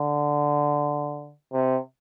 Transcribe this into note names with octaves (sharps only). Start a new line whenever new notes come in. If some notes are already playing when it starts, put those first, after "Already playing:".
Already playing: D3
C3